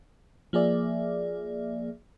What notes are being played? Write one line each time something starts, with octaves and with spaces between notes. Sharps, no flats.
F3 A#3 G#4 D5 E5